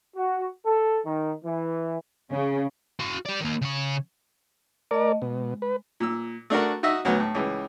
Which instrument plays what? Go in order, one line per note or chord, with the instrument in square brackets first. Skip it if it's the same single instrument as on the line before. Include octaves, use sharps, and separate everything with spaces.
[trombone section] F#4
A4
D#3
E3
[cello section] C#3
[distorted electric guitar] F#4 F5
G4 D5
D#3 A#3
C#3 C#5
[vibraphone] A3 D#5 [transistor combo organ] A#4 D5
[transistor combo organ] B2 [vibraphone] G#3
[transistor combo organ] B4
[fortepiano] A#2 E6
A3 D4 F#4 A#4
D#4 F#4 D#5 E5
D2 F#3 B3
A2
C#2 E3